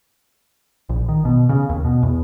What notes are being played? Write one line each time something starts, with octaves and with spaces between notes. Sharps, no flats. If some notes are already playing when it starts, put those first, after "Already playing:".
A#1
D#3
B2
C#3
D#2
B2
E2